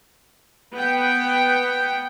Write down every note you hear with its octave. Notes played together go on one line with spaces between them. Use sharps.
B3 G5